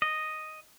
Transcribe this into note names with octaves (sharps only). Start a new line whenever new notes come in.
D#5